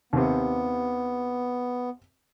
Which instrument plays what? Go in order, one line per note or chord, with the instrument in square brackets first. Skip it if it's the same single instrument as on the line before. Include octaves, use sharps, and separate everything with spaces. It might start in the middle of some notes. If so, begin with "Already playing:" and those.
[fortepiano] D#2 C3 [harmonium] B3